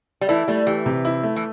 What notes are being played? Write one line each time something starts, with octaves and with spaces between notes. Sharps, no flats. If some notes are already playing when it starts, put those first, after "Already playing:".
G3
E3 A3 E4
G3 A3
E3 G4
C3
E4
A3
E3